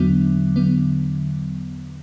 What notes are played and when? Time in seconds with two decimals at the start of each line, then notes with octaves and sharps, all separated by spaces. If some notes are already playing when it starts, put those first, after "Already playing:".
Already playing: E2 D3 F#3 B3
0.56 E2 D3 F#3 B3